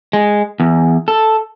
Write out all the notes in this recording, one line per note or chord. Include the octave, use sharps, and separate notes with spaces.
G#3
E2
A4